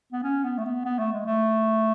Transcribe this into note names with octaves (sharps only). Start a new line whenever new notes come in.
B3
C#4
B3
A3
B3
B3
A3
G#3
A3